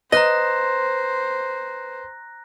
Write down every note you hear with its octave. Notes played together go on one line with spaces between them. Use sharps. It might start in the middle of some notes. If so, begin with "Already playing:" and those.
B4 C5 D#5 A#5 F#6 A#6